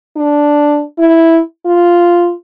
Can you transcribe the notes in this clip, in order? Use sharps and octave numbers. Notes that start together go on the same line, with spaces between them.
D4
E4
F4